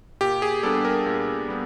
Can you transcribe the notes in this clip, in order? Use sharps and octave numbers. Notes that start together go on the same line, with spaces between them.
A#2 G4
G#4
G3 B3 D4 A4
A#4
A#2
G3 B3